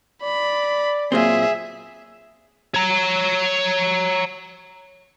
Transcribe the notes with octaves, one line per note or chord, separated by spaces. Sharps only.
D5 B5
A#2 F#3 C4 G#4 E5
C#5 A#5